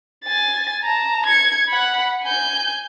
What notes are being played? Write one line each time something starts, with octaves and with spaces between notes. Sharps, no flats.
G#5 A6
A5 A#5
G#6 C#7
F#5 B5
G#5 G6